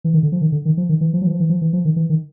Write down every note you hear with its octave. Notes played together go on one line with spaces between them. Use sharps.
E3
D#3
D3
F3
D#3
D3
D#3
F3
D#3
E3
F3
F#3
E3
F3
E3
F3
E3
F3
D#3
E3
D#3